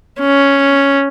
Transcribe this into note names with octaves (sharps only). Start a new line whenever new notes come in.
C#4